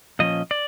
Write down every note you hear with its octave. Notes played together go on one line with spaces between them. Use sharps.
A#2 F3 C#4 D#5
D5